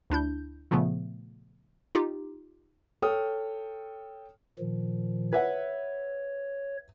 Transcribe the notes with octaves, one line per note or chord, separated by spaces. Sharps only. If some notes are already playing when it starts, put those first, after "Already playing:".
D2 D4 E4 G6
A#2 C#3 F3 A3 B3
D#4 F4 G4
A4 C#5 G5 D#6 F6
A#2 D#3 F3
B4 C#5 E5 F#5